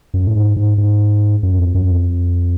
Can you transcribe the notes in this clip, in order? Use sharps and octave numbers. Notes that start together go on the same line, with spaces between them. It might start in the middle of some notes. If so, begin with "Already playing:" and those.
F#2
A2
G#2
G#2
G#2
F#2
F2
F#2
F2